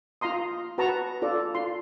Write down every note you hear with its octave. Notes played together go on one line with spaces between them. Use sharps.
F4 F5 A#5 C6 D#6
F#4 B4 A5 A#5 C#6
F4 A4 D5
F4 C6